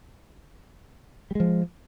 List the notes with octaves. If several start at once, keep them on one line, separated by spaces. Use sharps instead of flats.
F3 G3 G#3